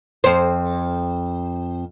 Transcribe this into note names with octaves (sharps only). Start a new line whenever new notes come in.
F2 C5